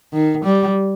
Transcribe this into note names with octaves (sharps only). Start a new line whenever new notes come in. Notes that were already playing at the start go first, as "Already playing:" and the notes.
D#3
G3